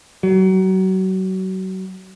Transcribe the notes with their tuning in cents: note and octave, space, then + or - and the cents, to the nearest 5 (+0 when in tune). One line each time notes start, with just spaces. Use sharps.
F#3 +30